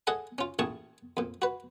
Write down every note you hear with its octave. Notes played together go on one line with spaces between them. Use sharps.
G#4 A4 D#5 F#5 G#5
C#4 F4
A1 A#2 G#4 A5 C#6
F2 A#2
F#4 B4